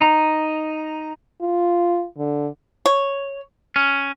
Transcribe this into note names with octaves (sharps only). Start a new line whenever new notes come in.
D#4 A#5
F4
D3
C#5
C#4